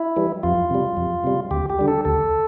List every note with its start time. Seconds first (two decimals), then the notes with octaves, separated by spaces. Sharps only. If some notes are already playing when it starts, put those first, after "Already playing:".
Already playing: E4
0.16 E3 G3
0.43 F2 F4
0.70 C3 G3
0.97 F2
1.24 C3 G3
1.51 D2 G4
1.70 G4
1.79 D3 G3
1.88 A4
2.05 D2 A4